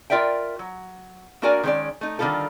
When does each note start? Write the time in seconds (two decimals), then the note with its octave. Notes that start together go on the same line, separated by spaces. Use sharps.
0.10 F4 A#4 D5 E5 G5
0.59 F#3
1.42 A#3 D4 F#4 A#4 D5 G#5
1.63 D#3 G#3 C#4 C5 D5
2.01 A3 D#4
2.19 D3 D#3 G3 B3 F4 A4